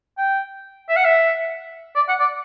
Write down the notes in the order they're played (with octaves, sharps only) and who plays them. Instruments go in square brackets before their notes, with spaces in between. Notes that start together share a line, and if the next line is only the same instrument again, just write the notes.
[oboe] G5
E5
F#5
E5
D5
F#5
D5